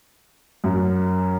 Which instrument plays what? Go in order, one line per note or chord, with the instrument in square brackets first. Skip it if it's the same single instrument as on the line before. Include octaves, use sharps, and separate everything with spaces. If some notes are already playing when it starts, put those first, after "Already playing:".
[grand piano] F#2